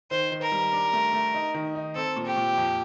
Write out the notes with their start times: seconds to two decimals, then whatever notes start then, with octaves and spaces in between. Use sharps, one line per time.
0.11 D#3 C5
0.31 D#3
0.42 A#4
0.52 G3
0.73 D4
0.93 A3
1.13 A3
1.34 D#4
1.54 D#3
1.75 D#4
1.96 C4 A4
2.16 A#2
2.26 G4
2.36 A#2
2.57 F2